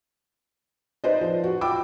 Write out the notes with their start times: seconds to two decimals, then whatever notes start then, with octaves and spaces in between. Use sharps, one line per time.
1.04 D#4 B4 C5 D5 D#5
1.21 F3
1.44 F#4
1.61 F4 G5 B5 D6 E6